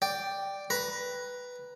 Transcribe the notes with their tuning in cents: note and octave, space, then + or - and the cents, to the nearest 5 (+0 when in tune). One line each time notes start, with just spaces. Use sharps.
D5 +0 G5 +0
B4 +0 A#5 +15